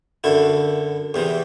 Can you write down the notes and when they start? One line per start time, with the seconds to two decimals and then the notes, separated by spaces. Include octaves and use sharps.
0.24 F#2 D3 E4
1.14 E2 C3 E3